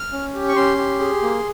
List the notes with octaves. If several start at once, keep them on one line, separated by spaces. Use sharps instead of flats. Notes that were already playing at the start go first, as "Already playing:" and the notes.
Already playing: F6
C#4
G4
C#6
C#4 C6
G4
G#4
A#3